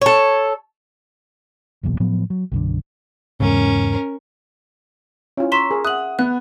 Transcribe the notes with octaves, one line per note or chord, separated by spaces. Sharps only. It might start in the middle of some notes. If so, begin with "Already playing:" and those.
A4 C#5
F#1 B1 E2 A#2
A2 F3 F#3 B3
F#3
B1 F#2 D3
E2 G#2 C#3 C#4 A#4
C#4 E4 F4
A#5 C6 C#6 E6 B6 E7
G#4 A#4
E5 F#5 D#6 F#6 F#7
B3 F#6